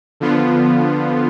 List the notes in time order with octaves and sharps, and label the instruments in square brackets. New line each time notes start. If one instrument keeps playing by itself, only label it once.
[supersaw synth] D3 F3 B3 F4